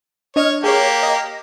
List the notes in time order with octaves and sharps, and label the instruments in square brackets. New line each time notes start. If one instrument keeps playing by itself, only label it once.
[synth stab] D4 D#5 F6 [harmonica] C#5
[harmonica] A#3 G4 [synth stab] G#4 C#5
[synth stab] D#5 A#6